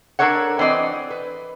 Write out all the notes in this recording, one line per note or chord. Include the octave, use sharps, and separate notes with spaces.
D4 A4 A#4 C#5 F#5
E3 C4 D5 D#5
B4